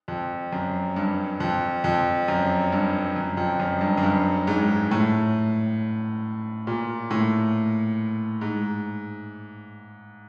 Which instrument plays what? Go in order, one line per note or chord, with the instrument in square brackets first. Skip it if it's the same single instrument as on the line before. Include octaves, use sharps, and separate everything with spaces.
[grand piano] F2
F#2
G2
F2
F2
F#2
G2
F#2
F2
F#2
G2
F#2
G2
G#2
A2
A#2
A2
G#2